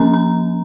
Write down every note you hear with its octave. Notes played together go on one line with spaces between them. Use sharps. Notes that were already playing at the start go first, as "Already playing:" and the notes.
Already playing: F3 A#3 C#4 A#5
A#5